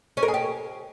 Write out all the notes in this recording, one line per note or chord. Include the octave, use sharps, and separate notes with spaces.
C#4
A#4
G#4
G4